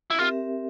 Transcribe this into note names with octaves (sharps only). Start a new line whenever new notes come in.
E4
C4 F4 G4 A#4 E5